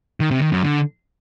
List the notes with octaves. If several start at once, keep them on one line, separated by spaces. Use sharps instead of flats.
D#3
C3
D#3
F#2
D3